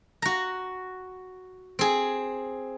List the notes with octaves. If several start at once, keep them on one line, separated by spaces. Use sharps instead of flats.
F#4 A#5
C4 G#4